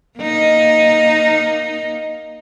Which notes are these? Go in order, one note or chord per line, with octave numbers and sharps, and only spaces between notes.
A#3 D#4